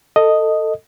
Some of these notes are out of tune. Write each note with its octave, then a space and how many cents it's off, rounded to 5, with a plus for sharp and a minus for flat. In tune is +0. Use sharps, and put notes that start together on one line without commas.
A4 +20 D#5 +0